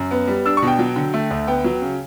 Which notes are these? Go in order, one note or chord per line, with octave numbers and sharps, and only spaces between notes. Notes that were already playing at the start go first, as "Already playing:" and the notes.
Already playing: F#2
B3
G3
D4 E6
C#6
B2
G5
F#3
D3
A3
D2
B3 G5
F#3
C#3